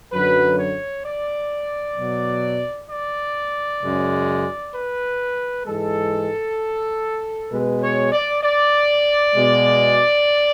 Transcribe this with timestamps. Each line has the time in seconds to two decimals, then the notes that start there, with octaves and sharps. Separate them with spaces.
0.12 F#2 D3 F#3 B4
0.59 C#5
1.05 D5
1.97 B2 F#3
2.90 D5
3.82 F#2 C#3 G#3
4.74 B4
5.66 G#2 E3 G#3 A4
7.51 B2 G#3 B4
7.82 C#5
8.12 D5
8.43 D5
9.35 B2 G#3